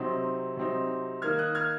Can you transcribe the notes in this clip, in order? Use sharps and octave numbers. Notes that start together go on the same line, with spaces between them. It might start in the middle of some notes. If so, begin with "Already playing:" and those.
Already playing: C3 F#3 C4 D#4
C3 F#3 C4 D#4
D#3 A#3 D#4 F6 G#6
D#6 F#6
F6 G#6